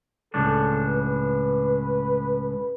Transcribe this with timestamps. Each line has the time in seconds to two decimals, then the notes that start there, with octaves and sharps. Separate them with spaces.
0.34 C#2 A2 D4 A4
0.87 B4